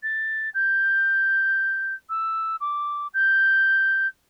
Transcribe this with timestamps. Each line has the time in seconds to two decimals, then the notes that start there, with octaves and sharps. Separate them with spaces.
0.03 A6
0.54 G6
2.09 E6
2.61 D6
3.13 G6